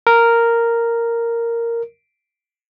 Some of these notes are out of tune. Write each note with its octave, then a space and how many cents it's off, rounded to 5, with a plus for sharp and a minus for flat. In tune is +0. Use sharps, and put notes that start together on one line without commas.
A#4 -5